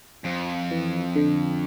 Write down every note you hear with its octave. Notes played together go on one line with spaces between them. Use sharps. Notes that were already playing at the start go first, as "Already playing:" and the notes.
F2 F3
E3
D3